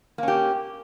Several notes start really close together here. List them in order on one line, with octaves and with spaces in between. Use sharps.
A#3 C#4 G4